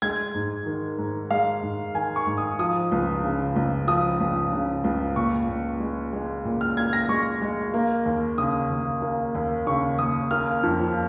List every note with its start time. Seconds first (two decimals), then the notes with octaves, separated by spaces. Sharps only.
0.02 G#3 G#6
0.35 G#2
0.66 D#3
0.98 G#2
1.31 G#3 F5
1.63 G#2
1.95 D#3 G#5
2.16 C#6
2.27 G#2
2.37 D#6
2.59 F3 D#6
2.92 C#2
3.24 C#3
3.56 C#2
3.88 F3 D#6
4.20 C#2
4.52 C#3
4.84 C#2
5.16 A#2 C#6
5.48 A#2
5.80 G#3
6.13 G#3
6.45 A#2
6.61 F6
6.77 A#2 G#6
6.93 A#6
7.09 G#3 C#6
7.42 G#3
7.74 A#3
8.06 D#2
8.38 C#3 D#6
8.70 D#2
9.02 A#3
9.35 D#2
9.67 C#3 C#6
9.99 D#2 D#6
10.31 A#3 F6
10.63 F2